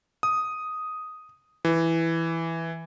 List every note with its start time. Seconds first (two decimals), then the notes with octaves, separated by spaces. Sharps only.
0.23 D#6
1.65 E3